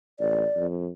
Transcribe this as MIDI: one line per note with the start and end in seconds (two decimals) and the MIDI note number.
0.20 0.44 33
0.20 0.66 74
0.56 0.89 41